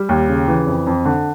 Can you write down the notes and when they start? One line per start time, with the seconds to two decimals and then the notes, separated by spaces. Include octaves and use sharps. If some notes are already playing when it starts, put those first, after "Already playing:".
Already playing: G3
0.09 D#2
0.29 C#3
0.48 E3
0.67 F2
0.87 F2
1.05 D3